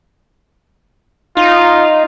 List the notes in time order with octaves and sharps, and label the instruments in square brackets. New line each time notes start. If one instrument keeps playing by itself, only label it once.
[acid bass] D#4 [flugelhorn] F4